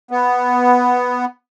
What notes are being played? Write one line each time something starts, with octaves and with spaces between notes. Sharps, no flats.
B3